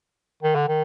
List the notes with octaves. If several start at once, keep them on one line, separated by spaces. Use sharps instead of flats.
D#3
D3
D#3